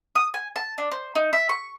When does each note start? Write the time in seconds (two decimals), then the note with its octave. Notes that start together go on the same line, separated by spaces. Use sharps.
0.15 D#6
0.34 G#5
0.56 A5
0.78 D4
0.91 C5
1.15 D#4
1.33 E5
1.49 C#6